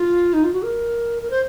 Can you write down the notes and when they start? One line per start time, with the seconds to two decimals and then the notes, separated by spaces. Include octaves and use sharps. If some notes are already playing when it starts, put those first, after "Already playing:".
Already playing: F4
0.33 D#4
0.44 F4
0.53 F#4
0.64 A#4
1.22 A#4
1.30 C5